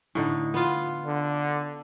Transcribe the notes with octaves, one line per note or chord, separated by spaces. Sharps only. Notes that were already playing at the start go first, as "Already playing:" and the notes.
A2 D3 D#4
B3 F4
D3